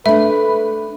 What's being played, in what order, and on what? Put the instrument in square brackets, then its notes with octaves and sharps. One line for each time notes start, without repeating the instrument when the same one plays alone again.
[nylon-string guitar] A3 D4 [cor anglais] B4 [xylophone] E5